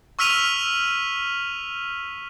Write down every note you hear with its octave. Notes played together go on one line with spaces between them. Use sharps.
C#6 E6 F6 B6 D#7 F7